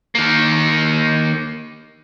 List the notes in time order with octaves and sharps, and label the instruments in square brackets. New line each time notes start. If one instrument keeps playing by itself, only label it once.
[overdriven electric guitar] D#3 A#3